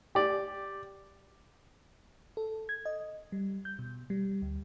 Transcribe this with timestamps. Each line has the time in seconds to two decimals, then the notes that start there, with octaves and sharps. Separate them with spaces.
0.15 G4 D5
2.37 A4
2.69 G#6
2.85 D#5
3.32 G3
3.65 G6
3.79 B2
4.10 G3
4.42 D2